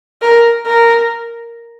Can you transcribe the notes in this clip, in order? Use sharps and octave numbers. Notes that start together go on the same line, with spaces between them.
A#4
A#4